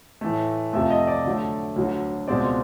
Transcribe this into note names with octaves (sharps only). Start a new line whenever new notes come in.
A2 E3 A3
F2 C3 F3 A3 E5
D#5
D5
D3 F#3 A3
D2 D3 F#3
C#2 B2 G#3 C4 D5